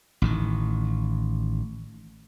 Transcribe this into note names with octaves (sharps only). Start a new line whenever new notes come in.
A1 A2 D#3